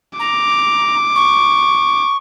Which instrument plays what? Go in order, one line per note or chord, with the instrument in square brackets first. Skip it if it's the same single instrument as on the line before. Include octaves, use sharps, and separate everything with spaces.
[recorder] A#5 [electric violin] D6
[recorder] C#6